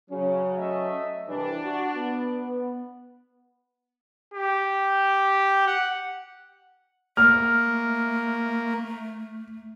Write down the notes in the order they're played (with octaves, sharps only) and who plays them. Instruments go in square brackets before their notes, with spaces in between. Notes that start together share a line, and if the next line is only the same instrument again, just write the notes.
[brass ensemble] C#3 [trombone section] F#3 C#4
[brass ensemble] A3 D#5 E5
[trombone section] C2 E3 G3 [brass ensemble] D4
[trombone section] F#4
B3
[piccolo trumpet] G4
F#5
[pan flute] A3 [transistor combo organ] A#3 [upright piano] F6